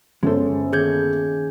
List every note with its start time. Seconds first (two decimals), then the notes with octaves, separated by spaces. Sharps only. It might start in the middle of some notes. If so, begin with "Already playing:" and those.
0.23 G1 G#3 C#4 A4 C5
0.73 D#2 G#4 G6 G#6